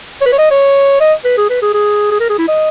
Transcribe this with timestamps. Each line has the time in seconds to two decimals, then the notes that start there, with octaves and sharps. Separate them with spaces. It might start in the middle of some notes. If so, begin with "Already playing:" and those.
0.21 C#5
0.26 B4
0.33 C#5
0.38 D#5
0.51 C#5
1.00 D#5
1.25 B4
1.37 G#4
1.50 B4
1.62 G#4
1.74 G#4
2.11 G#4
2.20 A#4
2.30 G#4
2.38 E4
2.48 D#5